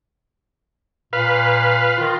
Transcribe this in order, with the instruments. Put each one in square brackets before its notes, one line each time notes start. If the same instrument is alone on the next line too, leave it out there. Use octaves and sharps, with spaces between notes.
[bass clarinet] A#2 [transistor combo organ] B4 F5
[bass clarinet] D#3 [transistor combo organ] F4